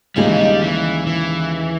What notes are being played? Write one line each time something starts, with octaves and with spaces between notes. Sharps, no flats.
D#2 C#3 G3 G#3 D#4 G#4
E3
G3
E3
E3